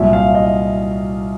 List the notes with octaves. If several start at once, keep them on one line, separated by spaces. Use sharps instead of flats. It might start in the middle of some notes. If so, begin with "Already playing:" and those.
Already playing: C2 A#2 F#3 E5
F5
D#5